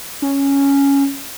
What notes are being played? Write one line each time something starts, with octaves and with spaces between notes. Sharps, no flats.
C#4